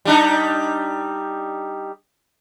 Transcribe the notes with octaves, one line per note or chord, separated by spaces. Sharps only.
G3 D4 D#4